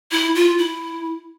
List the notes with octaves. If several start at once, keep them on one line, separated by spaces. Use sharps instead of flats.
E4
F4
E4